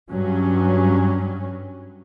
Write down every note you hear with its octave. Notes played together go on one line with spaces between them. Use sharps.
G2 F#3 G3 C#4